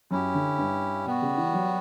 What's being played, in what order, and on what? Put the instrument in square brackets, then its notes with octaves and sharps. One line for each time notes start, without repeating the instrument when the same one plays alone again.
[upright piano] F#2 [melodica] C#4 E4 G4
[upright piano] D3
G2
[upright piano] B2 [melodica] G3 B3 F#4
[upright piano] C#3
E3
F#3